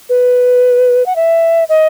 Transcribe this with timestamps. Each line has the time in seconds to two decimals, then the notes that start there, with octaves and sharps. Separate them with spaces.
0.09 B4
1.06 F#5
1.16 E5
1.69 D#5